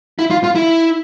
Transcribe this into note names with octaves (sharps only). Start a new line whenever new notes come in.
E4
F4
F4
E4